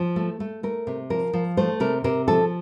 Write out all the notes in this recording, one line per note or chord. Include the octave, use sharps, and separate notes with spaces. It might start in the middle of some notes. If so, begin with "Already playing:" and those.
Already playing: F3
A3
A3
A3 A#4
C3
F3 A#4
F3
A3 C5
C3 A#4
C3 A#4
F3 A4